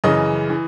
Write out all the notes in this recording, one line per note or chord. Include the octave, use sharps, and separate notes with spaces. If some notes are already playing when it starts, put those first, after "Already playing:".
F#2 C#3 E3 D#5
E3